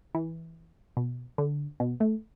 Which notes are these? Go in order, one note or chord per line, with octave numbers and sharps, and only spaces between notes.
E3
B2
D3
B2
A3